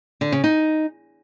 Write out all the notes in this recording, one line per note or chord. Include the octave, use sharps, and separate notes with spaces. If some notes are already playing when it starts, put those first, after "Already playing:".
D3
C#3
D#4